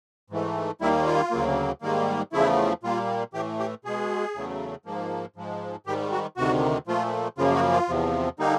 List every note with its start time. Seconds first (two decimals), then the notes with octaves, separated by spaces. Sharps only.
0.30 G#2 E3 A3
0.81 D#2 D#3 G3 A#3 E4
1.07 F4
1.31 D2 C#3 F#3 A#3
1.82 G#2 D#3 G3 A#3
2.33 E2 C#3 F3 A3 E4
2.83 A#2 G3 A#3 F4
3.34 A2 E3 A3 G4
3.59 G4
3.85 B2 G#3 G#4
4.35 E2 C#3 F#3 A3
4.85 G#2 F3 A#3
5.36 G#2 F3 G#3
5.86 G#2 D#3 G3 G4
6.12 F#4
6.37 D2 C3 D#3 F#4
6.87 A#2 F3 A3 F4
7.38 F#2 C#3 F3 A#3 F4
7.55 F#4
7.72 F4
7.89 E2 C3 F3
8.39 D3 G3 A#3 D#4